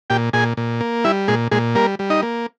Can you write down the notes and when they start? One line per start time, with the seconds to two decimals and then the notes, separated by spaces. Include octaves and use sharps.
0.10 A#2 G4 G5
0.33 A#2 G#4 G#5
0.57 A#2
0.81 A#3
1.04 G3 E4 E5
1.28 A#2 G#3 G#4
1.51 A#2 G#3 G#4
1.75 G3 A#3 A#4
1.99 G3
2.10 D#4 D#5
2.22 A#3